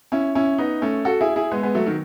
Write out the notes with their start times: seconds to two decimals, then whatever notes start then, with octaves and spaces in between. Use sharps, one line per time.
0.12 C#4 E4
0.35 C#4 E4
0.58 B3 D#4
0.82 A3 C#4
1.05 F#4 A4
1.21 E4 G#4
1.36 E4 G#4
1.51 G#3 B3
1.63 G#3 B3
1.75 F#3 A3
1.86 D#3 F#3